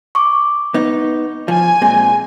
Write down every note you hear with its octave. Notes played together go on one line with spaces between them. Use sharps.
C#6 D6
B3 D#4
F3 G#5
A#2 G#3 C4